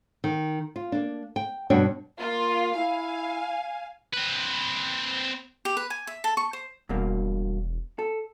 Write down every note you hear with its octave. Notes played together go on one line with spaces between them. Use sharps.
D#3
F4
A#3 D4
G5
G2 B2 D4 F#4 C#5 G5
A#3 F4
E4 F5 G#5
C4 B4
G4
B4
G#5
E5
A4
C#6
C5
E1 G2 B2 A#3
A4